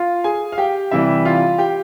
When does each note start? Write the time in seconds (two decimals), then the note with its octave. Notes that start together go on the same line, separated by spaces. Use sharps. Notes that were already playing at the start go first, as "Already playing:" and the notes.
Already playing: F4 F5
0.24 G#4 G#5
0.52 F5
0.58 G4 G5
0.91 C3 E3 G3 E4 E5
1.25 F4 F5
1.58 G4 G5